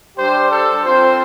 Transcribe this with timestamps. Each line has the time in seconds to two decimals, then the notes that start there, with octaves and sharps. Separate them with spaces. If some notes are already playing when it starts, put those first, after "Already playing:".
0.17 G3 D4 G4 C5
0.51 A4
0.84 C4 F4 C5